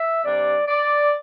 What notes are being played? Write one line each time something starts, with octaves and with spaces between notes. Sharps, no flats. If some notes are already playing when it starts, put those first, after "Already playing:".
Already playing: E5
C3 G3 D4 D5
D5